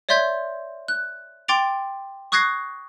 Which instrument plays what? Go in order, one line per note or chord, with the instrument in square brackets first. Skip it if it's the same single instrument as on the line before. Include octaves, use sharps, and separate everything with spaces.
[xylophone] C#5 D5 E5 C6 G6 G#6
F#6
G5 C6 D6 A6 D7 F7
C#6 D#6 F#6 G#6 A#6 C7